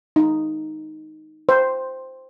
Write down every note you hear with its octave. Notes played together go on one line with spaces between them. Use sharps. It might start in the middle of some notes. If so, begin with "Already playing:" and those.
D#4
C5